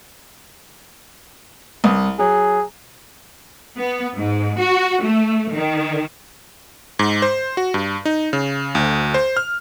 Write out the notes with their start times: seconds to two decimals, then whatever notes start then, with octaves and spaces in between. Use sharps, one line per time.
1.84 C2 D#6
2.19 F#3 G#4
3.77 B3
4.17 G#2
4.58 F#4
5.03 A3
5.53 D#3
6.99 G#2
7.22 C5
7.57 F#4
7.74 G2
8.05 D#4
8.33 C#3
8.75 D2
9.14 C5
9.37 F6